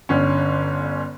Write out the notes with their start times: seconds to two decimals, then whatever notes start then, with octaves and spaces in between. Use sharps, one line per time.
0.09 G1 D3 C#4